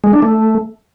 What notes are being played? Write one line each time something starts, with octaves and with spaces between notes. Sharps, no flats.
G#3
D4
A3